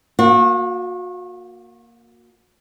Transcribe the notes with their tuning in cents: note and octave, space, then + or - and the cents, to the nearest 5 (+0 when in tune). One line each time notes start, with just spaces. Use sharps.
A#3 +0 F#4 -35